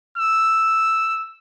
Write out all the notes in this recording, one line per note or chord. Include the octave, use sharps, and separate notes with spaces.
E6